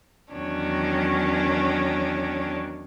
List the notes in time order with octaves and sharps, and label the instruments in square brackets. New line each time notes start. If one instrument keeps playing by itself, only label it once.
[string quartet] E2 D#3 F#3 C#4 D4 C#5